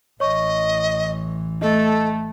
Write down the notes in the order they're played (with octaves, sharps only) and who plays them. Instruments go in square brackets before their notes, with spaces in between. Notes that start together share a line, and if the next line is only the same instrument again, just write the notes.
[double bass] A1 E3 [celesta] C#5 C#6 [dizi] D#5
[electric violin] A3 [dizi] A4 [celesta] D#5